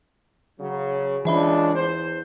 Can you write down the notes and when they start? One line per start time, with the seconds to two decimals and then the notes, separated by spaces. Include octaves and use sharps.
0.60 C#3 F#3
1.25 C#2 E3 D4 E5 B5
1.75 E2 C5